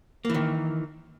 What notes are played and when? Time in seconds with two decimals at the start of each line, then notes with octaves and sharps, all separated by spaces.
0.25 A#3
0.30 E3
0.34 D#3